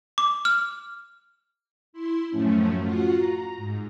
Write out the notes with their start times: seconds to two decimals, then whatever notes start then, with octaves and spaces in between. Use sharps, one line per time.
0.18 D6
0.45 F6
1.93 E4 C6
2.30 F#2 A2 F3 A3 C#4
2.80 F4 F#4 F#5
3.15 A#5
3.56 G#2